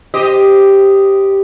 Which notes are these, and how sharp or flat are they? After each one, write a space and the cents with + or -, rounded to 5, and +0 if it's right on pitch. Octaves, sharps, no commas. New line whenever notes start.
G4 +0 C5 -10 D#5 +0